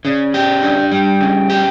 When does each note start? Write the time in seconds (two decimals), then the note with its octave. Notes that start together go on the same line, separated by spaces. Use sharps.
0.05 C#3 D5
0.34 G4
0.62 D4
0.91 G3 G5
1.21 C#3
1.50 G4